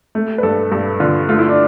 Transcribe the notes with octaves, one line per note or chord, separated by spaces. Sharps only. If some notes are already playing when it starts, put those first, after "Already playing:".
A3
B4
G2 A4
G2 A4
D3 F4
A3 F4
E4
D4